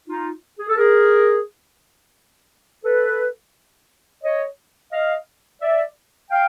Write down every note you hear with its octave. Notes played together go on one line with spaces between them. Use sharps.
D#4 F4
G#4
A4
G#4 A#4
A4 B4
C#5 D#5
D#5 F5
D5 E5
F5 G5